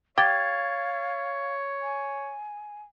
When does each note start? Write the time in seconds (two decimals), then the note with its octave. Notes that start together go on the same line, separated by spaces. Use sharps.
0.18 G4 C#5 F5 G#6 A6
1.82 G#5